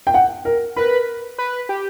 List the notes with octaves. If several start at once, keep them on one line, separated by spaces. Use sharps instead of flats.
G5
F#5
A#4
A#4 B4
B4
G4